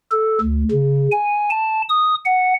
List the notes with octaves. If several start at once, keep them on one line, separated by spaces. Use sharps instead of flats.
A4
D2
C#3
G#5
A5
D#6
F#5